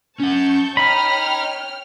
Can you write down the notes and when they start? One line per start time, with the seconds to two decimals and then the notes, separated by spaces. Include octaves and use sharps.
0.20 C#4 F#5 A5 C#6 G6
0.77 C#5 D#5 G5 A#5 B5 F6